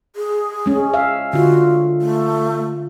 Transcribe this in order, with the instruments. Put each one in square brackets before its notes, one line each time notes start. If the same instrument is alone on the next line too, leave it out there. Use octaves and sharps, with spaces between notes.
[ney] G#4
[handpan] G#3 C#4
E5 F5
[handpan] D3 F4 [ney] F#4
[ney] A3